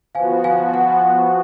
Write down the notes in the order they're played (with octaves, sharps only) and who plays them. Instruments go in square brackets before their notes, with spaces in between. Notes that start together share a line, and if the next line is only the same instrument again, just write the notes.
[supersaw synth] F3 B3 F#4 [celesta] F5 G#5
[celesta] F5 G#5
F#5